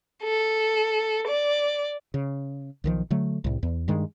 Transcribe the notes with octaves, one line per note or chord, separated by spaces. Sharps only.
A4
D5
C#3
B1 D#3 F3
D3 F#3 A3
C2 A2
E2
G2 D#3 G#3